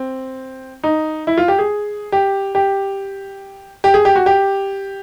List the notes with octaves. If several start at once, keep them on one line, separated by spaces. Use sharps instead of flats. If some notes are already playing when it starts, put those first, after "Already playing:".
Already playing: C4
D#4
E4
F4
G4
G#4
G4
G4
G4
G#4
G4
F#4
G4